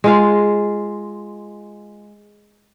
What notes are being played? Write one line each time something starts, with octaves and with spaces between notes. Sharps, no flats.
G#3 F4 F5